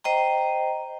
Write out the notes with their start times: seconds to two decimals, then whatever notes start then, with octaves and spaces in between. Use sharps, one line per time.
0.04 C5 D#5 G5 A#5